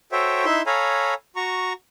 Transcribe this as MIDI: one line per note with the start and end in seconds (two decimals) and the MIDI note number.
0.12 0.45 66
0.12 0.45 69
0.12 0.45 72
0.12 0.45 73
0.12 0.45 76
0.12 0.45 79
0.45 0.62 63
0.45 0.62 64
0.45 0.62 76
0.45 0.62 84
0.66 1.14 69
0.66 1.14 73
0.66 1.14 77
0.66 1.14 80
0.66 1.14 82
0.66 1.14 83
1.36 1.73 66
1.36 1.73 82
1.36 1.73 85